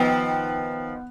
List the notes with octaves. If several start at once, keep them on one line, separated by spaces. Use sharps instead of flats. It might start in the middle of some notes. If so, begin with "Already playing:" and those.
Already playing: D#3 F3 B3